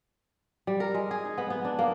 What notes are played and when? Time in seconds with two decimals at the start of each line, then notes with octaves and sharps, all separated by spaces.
0.67 G3
0.80 A#4
0.94 G#3
1.11 G#4
1.25 D#4
1.38 B3
1.50 B3
1.65 D4
1.79 A#3